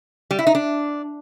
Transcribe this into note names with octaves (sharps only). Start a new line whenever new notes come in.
G3
E4
D#4
D4